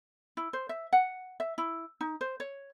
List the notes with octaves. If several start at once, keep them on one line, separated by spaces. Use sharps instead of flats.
E4
C5
E5
F#5
E5
E4
D#4
C5
C#5